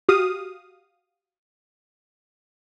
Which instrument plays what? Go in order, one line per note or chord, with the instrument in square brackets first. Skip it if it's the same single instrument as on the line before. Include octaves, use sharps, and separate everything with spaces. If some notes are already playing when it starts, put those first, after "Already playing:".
[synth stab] F#4 G4 F5 D#6